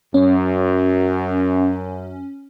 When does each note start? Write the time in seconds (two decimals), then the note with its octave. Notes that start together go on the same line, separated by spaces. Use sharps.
0.14 F#2 C#4